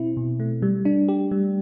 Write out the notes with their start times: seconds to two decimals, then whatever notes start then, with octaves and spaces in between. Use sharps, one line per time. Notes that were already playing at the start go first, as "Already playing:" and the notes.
Already playing: B2 C4 E4
0.17 B2
0.40 A3
0.62 G3
0.85 D4
1.08 G4
1.31 G3